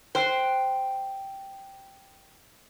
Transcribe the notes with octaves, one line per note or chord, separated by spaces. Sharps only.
C5 G5 F#6